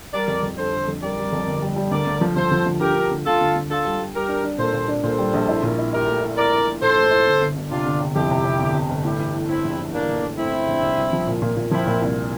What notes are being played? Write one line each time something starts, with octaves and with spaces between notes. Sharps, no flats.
G3 A#4 D5
F2
F2
D3 A4 C5
D3
F2
G3 A#4 D5
G3
F2
G1
G3
G3
D2 A#4 D5
D2
F3
F3 A4 C5
F3
D2
D3 G4 A#4
D3
D2
D2 F4 A4
D2
D2
D4 F4 A4
G3
G3
G3 G4 A#4
D4
D4
A#2 A4 C5
A#2
D4
A#2 A4 C5
G3
A#1
E4
A#2
E4
E4 G4 A#4
A3
E4
E4 A#4 D5
E4
A#1
A#2 A4 C5
A3
E4
G1
G1
G1
C3 D4 F4
G1
C3
F2 E4 G4
C3
C3
G1
C3
G1
A2 E4 G4
E3
A2
A2 C4 E4
A#1
E3
E3 A#3 D4
A#1
A3
A2 C4 E4
A2
A#1
C2
C2
F3
A#2
A#2
A#2
F3 C4 E4
A#2
C2